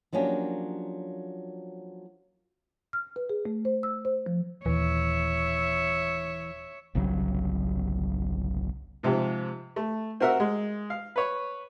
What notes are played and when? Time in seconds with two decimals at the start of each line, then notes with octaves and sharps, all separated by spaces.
0.12 F3 F#3 A#3 C#4 D4 G4
2.93 F6
3.16 B4
3.30 G#4
3.45 A3
3.65 C5
3.83 E6
4.05 C5
4.26 F3
4.66 D#1 D#2 E3 C#5 E5
6.95 G1 C2 C#3 F#3
9.03 G#2 C3 F3 G4
9.76 A3
10.20 C4 F#4 A#4 E5 F#5
10.40 G#3
10.90 F5
11.16 B4 C#5